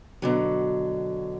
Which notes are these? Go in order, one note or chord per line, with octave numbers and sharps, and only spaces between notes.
B2 D3 F#3